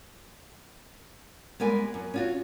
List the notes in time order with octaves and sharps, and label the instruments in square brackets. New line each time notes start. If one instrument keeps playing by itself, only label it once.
[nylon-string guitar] G3 G#3 B3 A#4 G#5
F#2
C#4 F4 F#4